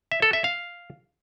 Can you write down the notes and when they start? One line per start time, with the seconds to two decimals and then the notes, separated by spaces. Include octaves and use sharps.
0.12 E5
0.22 A4
0.33 E5
0.44 F5